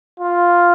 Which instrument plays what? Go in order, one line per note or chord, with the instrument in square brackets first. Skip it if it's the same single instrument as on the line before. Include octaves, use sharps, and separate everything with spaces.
[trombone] F4